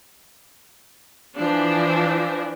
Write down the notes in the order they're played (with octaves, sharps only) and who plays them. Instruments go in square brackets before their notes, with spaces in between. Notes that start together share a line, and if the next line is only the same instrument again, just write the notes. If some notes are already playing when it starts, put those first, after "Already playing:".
[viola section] E3 F3 D4